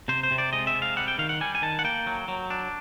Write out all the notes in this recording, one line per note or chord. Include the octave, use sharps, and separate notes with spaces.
C3 C5
C5
C3
D5
G#3 D#5
E5
C3
F5
G3 F#5
G5
D#3 F5
F#5
G3 G#5
G#5
D#3 A5
F#5
A#3 G5
F#3
F#3
D4